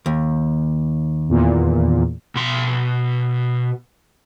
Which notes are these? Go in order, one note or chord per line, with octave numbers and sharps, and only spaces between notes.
D#2
E2 A#2
B2 C6